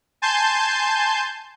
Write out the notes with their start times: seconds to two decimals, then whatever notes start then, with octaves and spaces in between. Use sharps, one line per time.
0.22 G#5 A5 C6 G6